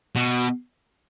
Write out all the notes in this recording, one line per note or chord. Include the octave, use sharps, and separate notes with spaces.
B2